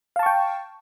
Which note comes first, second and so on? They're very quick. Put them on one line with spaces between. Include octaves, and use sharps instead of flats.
F5 A5 C#6 G5